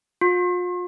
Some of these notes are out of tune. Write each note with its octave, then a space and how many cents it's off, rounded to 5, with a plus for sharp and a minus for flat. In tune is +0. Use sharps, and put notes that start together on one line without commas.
F4 +40